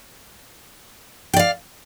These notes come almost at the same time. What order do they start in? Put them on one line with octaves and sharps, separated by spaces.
G5 D5 F5